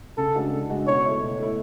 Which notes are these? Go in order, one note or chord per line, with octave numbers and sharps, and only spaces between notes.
C#3 A4
G#3 D4 F#4
C#3
G#3 D4 F#4
B2 C#5
A3 E4
B2
A3 E4